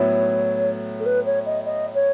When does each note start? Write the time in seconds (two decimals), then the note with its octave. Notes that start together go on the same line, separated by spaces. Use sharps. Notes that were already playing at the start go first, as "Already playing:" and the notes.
Already playing: A2 F#3 B3 E4 C#5
1.00 A4
1.06 B4
1.26 C#5
1.46 D#5
1.66 D#5
1.95 C#5